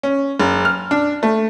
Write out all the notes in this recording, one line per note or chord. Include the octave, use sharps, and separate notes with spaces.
C#4
F#1
F6
D4
A3